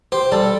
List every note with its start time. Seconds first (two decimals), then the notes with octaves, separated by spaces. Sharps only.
0.12 G4 C5
0.32 G3 A4